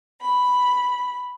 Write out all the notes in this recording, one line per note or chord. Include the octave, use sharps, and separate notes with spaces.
B5